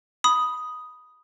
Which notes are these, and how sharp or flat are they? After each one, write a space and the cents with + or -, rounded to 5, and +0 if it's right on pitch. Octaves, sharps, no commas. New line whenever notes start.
B5 +0 D#6 +0